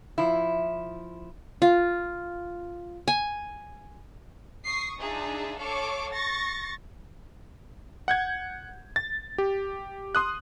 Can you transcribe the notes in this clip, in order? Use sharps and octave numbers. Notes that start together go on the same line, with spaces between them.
F3 E4
F4
G#5
C#6 D#6 C7
D4 D#4 F4 G#4 D5 E5
A4 C#5 F5 C#6 D6
C#6 A6 A#6
F#5 G6 G#6
A6
G4
C6 D#6 F#6